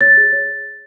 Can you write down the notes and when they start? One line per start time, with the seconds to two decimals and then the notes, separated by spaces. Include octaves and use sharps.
0.01 C#5 A6
0.17 G#4
0.33 C#5